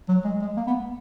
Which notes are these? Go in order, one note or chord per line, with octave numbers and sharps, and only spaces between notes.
F#3
G#3
G#3
A#3
B3